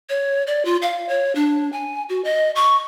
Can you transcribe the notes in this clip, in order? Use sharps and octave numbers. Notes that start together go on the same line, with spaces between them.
C#5
D5
F4
F5
C#5
D4
G#5
F#4
D#5
C#6